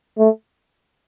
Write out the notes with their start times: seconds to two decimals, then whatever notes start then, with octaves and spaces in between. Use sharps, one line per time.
0.18 A3